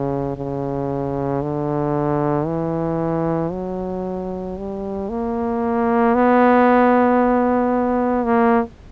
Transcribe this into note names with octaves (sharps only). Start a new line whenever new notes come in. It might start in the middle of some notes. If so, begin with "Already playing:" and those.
Already playing: C#3
C#3
D3
E3
F#3
G3
A#3
B3
A#3